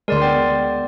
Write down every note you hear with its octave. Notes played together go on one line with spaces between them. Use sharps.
D2 G#3 A#4 D5 C6
B3 D5 G5